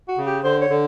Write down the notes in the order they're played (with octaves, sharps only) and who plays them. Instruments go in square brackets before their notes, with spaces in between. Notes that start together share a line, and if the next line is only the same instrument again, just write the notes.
[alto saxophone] F#4
[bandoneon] C#3
[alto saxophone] G4
[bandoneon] D3 [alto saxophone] C5
[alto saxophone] C#5
[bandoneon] D3